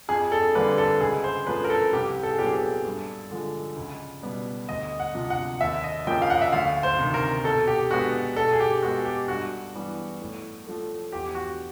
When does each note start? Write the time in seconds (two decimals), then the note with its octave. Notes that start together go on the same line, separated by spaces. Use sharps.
0.09 F2 G#4
0.32 A4
0.55 D3 G3 A#3 B4
0.78 A4
1.01 C#2 G#4
1.24 C5
1.47 C#3 F3 A3 B4
1.64 A#4
1.70 A4
1.92 C2 G4
2.23 A4
2.31 G#4
2.39 A#2 F#3 B3 G4
2.46 G#4
2.54 A4
2.85 G2
3.31 D3 F3 G#3
3.77 C#2
4.23 B2 G3 B3
4.69 D2 D#5
5.00 F#5
5.14 C3 F3
5.30 F#5
5.61 D#2 E5
5.84 D#5
6.07 C#3 F3 A#3 G5
6.22 F5
6.30 F#5
6.41 E5
6.52 D2 F5
6.83 C5
6.99 C3 D#3
7.14 A#4
7.44 B2 A4
7.67 G4
7.90 G#3 B3 F#4
8.36 B2 A4
8.52 G#4
8.60 G4
8.82 G#3 B3 F#4
9.05 G4
9.28 G2 F#4
9.75 E3 G3 B3
10.21 A2
10.66 F3 A3
11.12 E2 G4
11.35 F#4